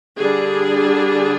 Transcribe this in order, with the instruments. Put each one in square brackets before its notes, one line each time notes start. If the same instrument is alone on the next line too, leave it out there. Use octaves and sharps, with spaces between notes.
[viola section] D3 G3 D4 G#4